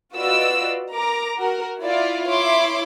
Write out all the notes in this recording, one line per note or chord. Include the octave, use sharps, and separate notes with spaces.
F4 F#4 B4 D5 D#5 E6
A#4 A#5 D6
F#4 A#4
E4 F4 D5
E4 C#5 C6 D6